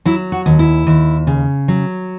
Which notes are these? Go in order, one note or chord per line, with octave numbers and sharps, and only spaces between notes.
F#3 E4
F#4
D#2
E4
D#2
C#3
F#3